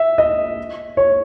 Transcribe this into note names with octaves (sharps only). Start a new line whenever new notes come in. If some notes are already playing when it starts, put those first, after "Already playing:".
Already playing: E5
D#5
C#5